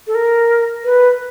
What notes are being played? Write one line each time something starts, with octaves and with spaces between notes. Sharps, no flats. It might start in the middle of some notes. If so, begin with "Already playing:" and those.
A4
A#4
B4